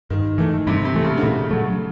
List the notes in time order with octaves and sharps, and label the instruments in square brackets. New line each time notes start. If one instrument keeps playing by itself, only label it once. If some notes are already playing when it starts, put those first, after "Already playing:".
[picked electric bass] G2 [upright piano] D#3
[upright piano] D#3 [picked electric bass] E3 A3
[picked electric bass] G2 [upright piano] C3
[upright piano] C3
[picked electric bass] E3 A3
[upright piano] C#3
D3
[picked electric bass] A#2 [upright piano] C#3
[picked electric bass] F#3 A3